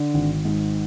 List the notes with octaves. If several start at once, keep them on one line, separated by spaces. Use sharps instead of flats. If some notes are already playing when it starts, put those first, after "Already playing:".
Already playing: D3
G#1
G#2